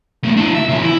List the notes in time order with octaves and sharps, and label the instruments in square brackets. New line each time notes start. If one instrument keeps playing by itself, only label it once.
[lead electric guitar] D#2 A3
D4 E4
E5
C#3 E3
E4